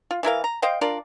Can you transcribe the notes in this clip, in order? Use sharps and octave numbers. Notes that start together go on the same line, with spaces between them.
F4
E3 E4 A#4 F5
A#5
C5 D#5 F5 G5
D4 F4 A#4 D5